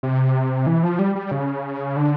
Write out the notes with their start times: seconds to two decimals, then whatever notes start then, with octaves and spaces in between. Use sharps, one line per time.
0.03 C3
0.67 E3
0.83 F3
0.99 G3
1.15 G3
1.31 C#3
1.96 D3